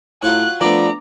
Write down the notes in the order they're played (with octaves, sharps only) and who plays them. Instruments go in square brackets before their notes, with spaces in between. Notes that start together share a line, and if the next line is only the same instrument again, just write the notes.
[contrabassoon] A2 [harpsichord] F#3 F4 C#5 [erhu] F#6
[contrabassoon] F3 [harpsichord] A3 B3 D4 [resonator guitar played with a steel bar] D5 [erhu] A#5